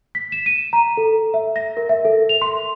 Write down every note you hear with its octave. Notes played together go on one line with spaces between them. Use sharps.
B6
E7
D#7
A#5
A4
E5
A#6
A#4
E5
A4
F7
C6